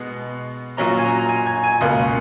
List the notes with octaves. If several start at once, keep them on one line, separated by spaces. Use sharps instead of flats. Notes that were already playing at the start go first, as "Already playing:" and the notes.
Already playing: B2 G#3 B3
A#2 F#3 C#4 A#5
G#5
A#5
A#5
G#5
G#5
G#5
C#2 B2 A#3